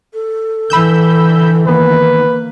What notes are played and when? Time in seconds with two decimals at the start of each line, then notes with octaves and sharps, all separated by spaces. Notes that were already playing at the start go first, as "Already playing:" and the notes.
0.13 A4
0.70 D3 E3 B5 E6 G6
1.67 D#3 A#3 B3 B4